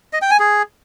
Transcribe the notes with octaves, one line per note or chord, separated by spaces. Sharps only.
D#5
G5
G#5
G#4